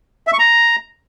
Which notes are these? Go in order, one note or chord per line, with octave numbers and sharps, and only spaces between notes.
E5
C#6
A#5